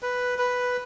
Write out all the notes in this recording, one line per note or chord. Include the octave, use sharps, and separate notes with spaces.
B4
B4